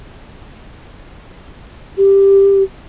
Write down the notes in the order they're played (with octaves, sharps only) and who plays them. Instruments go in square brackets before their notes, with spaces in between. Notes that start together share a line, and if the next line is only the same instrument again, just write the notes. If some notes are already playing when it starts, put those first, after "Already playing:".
[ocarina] G4